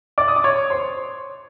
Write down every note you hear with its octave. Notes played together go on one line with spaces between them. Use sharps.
D5 D6
D#6
D6
C#5 C#6
C5 C6